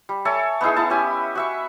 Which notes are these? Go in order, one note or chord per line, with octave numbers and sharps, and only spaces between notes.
G3
A4 C#5 E5 G#5
B3 D#4 E4 G#4
B3 E4 A5
C#4 G4 G#5
F#4 E5 C#6